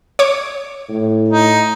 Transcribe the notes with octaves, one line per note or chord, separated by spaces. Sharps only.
C#5 D6
A2
D#4